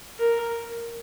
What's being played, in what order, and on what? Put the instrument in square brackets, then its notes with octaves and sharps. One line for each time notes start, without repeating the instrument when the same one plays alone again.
[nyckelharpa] A#4